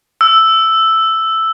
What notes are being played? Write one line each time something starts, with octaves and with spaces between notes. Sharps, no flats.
E6